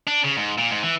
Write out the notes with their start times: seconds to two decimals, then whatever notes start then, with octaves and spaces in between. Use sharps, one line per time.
0.07 D4
0.24 C#3
0.37 G#2
0.58 A#2
0.71 G#2
0.83 E3